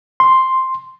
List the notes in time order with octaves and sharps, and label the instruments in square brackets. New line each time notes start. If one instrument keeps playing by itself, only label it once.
[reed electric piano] C6